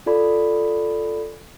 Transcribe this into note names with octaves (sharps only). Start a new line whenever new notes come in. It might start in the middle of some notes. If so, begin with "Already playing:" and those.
F4 A4 D5 B5